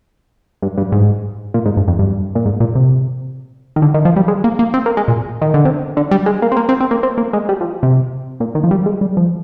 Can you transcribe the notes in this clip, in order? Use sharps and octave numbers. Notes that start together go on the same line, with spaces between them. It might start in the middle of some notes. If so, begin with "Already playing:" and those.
G2
G2
G#2
A#2
G#2
G2
F2
G2
A#2
G#2
A#2
C3
D#3
D3
D#3
F3
G3
G#3
A#3
A#3
C4
A#3
G#3
A#2
D#3
D3
C3
D3
G3
G#3
A#3
C4
A#3
C4
C4
A#3
C4
A#3
G#3
G3
F3
C3
A#2
D#3
F3
G3
G#3
G3
F3